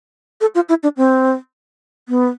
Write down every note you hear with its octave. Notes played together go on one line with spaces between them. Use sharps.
A4
F4
E4
D4
C4
B3